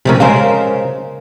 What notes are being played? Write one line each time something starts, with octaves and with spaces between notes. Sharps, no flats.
C3 F3 A3 C#4 A#4
C#3 G#3 A#4 C5 F5